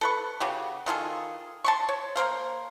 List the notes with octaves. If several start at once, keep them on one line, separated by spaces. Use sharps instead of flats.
A4 B4 C#6
C#3 F#4 G4
D#3 F4 G#4 A4
A5 C6 C#6
C#5
A#3 A#4 C5 F5